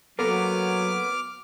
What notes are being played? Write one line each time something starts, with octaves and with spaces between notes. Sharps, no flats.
F#3 A#3 B3 A4 D6 F6